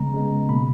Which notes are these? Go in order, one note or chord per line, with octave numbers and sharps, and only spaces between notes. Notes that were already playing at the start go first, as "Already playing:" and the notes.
Already playing: C#3 G#3 B3 A#5
C#3 G#3 B3
B2 A#3 B5